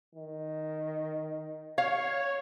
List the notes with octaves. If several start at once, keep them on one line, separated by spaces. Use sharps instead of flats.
D#3
C#5 F5